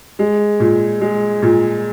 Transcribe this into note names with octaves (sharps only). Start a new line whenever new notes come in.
G#3
A#2
G#3
A#2